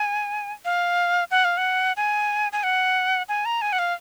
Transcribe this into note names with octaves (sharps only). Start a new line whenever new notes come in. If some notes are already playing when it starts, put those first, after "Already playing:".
Already playing: G#5
F5
F#5
F5
F#5
G#5
G#5
F#5
G#5
A#5
G#5
F#5
F5